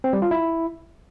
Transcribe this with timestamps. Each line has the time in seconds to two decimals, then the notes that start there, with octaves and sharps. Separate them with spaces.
0.04 C4
0.13 G3
0.22 F4
0.31 E4